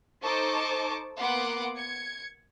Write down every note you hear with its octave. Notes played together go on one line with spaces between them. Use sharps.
D#4 A4 C5 A5 C#6 D6
A#3 B3 F#5 C6 D6
G#6 C#7